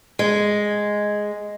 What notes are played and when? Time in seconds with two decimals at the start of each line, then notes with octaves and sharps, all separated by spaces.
0.19 G#3